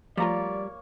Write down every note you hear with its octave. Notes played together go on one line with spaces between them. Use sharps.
F3 G3 A3 A#3 F4 C#5 D5 A#5